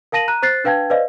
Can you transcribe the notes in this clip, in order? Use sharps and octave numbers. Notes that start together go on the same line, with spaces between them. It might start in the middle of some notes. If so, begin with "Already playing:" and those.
A#4 F5 A5 A#6 D#7 F#7
A#5 F#6 D#7
C5 F#6 A6 C7
D4 B4 F5 G5 A5 G#6
B4 C5 D5 D#5 F5